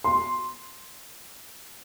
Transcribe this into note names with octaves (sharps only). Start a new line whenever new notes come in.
C6